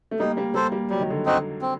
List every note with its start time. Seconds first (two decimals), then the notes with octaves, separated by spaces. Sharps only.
0.11 A3
0.19 G3 A#3 D#4
0.37 G3 A#3
0.54 G3 A#3 A4 C5
0.72 G3 A#3
0.90 F#3 G3
1.00 D#3
1.10 D3 F#3
1.26 C4 D#4 F#4
1.61 C4